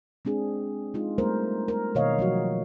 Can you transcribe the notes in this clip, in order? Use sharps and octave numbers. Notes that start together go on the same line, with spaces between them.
G#3 C4 D4 G#4
G#3 D#4 F4
G3 A3 B3 A#4 C5
A#4
B2 D#3 A#3 C#5 D#5 F5
F3 F#3 F#4